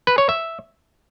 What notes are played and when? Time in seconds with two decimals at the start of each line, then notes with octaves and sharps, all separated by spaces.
0.07 B4
0.18 C#5
0.29 E5